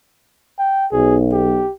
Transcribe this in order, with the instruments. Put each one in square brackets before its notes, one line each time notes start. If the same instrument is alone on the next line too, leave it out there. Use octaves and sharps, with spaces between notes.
[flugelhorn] G5
[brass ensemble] B1 [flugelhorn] G#4
[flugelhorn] G4